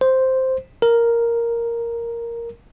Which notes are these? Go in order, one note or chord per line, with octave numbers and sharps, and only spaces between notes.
C5
A#4